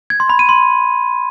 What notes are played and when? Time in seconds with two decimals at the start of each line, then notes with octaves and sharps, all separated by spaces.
0.10 G#6
0.20 C6
0.30 B5
0.39 D#7
0.49 C6